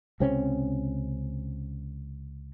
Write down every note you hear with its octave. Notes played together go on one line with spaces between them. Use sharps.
C#2 C3 C4 C#4